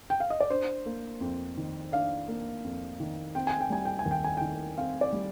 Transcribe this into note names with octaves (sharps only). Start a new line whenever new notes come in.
G5
F5
D#5
D5
D4 C5
A#3
F2
D#3
D4 F5
A#3
F2
D#3
C4 G5
G#5
G5
G3 G#5
G5
G#5
D#2
G5
G#5
D#3 G5
C4 F5
D5
G3